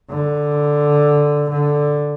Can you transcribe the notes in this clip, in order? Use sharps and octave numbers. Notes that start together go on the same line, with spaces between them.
D3
D3